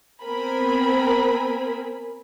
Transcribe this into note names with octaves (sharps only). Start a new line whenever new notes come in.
B3 C4 A#4 C5 G#5 B5